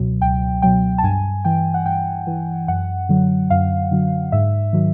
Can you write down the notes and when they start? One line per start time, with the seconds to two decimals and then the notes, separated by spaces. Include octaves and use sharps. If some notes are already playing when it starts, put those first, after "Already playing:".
Already playing: C#2 B2 F#3
0.22 C#2 G5
0.62 B2 F#3 G5
0.98 A5
1.03 G2 G#5
1.45 E3 G5
1.74 F#5
1.86 G2 G5
2.27 E3
2.68 F#2 F#5
3.09 D3 F#3
3.50 F#2 F5
3.92 D3 F#3
4.32 G#2 E5
4.73 D#3 F#3